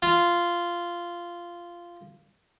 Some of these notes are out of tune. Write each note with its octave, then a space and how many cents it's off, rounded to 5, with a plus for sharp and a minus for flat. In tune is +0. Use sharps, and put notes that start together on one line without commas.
F4 -10